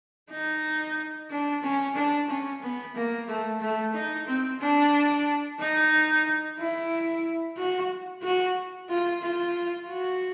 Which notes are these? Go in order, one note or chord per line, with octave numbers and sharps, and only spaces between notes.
D#4
D4
C#4
D4
C#4
B3
A#3
A3
A3
D#4
C4
D4
D#4
E4
F#4
F#4
F4
F4
F#4